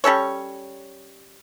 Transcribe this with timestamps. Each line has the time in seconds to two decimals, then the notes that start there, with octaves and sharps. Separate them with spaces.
0.04 G3 C#4 A4 C#5